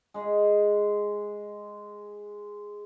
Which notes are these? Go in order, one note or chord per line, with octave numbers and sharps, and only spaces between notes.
G#3 G#4